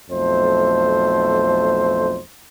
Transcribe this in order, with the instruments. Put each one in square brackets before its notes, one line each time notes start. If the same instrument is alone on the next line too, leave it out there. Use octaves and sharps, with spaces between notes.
[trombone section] B1 F2 A3 C5